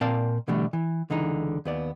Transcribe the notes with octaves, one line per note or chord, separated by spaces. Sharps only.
A#2 C4 A#4 D5 F5 A5
B2 D3 E3 G3 A3
E3
C#2 D3 E3 D#4
D#2 B3 D5